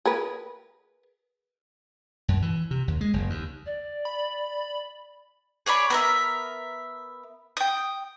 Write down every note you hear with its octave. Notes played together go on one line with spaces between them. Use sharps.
G#4 A#4 B4
F#2
E3
C3
D#2
G#3
F#1
D#2
D5
B5
G#4 C#5 D5 B5
B3 A#4 E5
G5 D#6